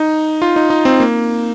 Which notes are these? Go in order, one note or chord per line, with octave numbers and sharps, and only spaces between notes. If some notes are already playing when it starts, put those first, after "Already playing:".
Already playing: D#4
F4
D#4
D#4
C4
A#3